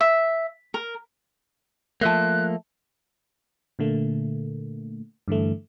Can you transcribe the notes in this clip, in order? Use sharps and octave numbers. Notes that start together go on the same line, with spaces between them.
E5
A#4
F3 A3 A#3 E5 A5 F#6
A#2 D3 A3 A#3
G2 D3 E3 A3